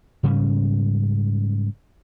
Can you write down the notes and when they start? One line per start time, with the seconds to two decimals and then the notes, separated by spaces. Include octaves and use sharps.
0.23 G#2 C#3 G3 C#4